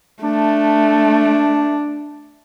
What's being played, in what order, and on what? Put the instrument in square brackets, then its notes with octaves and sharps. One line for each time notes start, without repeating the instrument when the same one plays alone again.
[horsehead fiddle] A3 [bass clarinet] D4